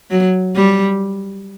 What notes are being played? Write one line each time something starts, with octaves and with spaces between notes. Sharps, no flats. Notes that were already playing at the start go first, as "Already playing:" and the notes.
F#3
G3